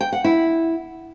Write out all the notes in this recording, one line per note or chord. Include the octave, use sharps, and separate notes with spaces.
G5
F#5
E4